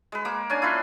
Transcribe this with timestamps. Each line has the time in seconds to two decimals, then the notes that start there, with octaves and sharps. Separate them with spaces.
0.12 G#3 B4
0.25 A#3 D6
0.50 C#4 D4 G#5
0.62 E4 F4 B4 C6